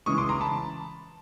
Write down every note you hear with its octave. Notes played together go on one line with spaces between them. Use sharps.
C#3 E3 G#3 C#6 D#6
C6 D6
A#5 C6
A5 B5